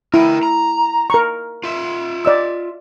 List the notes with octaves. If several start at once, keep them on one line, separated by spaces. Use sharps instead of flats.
E4 A#4 G5
A#5
A#4 C#6
F4 E5
D5 D#5 E6